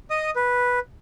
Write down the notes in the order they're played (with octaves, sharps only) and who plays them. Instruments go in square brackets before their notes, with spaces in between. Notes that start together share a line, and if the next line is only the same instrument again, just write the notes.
[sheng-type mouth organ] D#5 D#6
B4